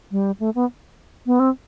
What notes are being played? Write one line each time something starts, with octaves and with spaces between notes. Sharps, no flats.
G3
A3
B3
B3
C4